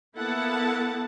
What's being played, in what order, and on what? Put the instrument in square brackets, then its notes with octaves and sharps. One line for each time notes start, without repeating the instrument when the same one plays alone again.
[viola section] A#3 B3 E4 A4 F#5 A5